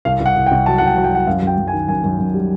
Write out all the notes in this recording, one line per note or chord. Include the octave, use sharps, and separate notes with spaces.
C2 F5
C2
F#5
C2
G5
C2
F#3 A5
F#5
C2 G5
F#3
G5
F#3 F#5
F#2 F5
F#2 G5
F#2
G#5
D#3
F#2 G#5
F#2
F#2
G3